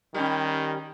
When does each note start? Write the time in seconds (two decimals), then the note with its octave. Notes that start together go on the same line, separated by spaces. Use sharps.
0.15 D#3 G3 C#4